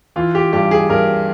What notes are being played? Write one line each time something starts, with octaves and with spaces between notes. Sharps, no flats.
E3 F4
G4
G2 G4
G#4
G2 A#4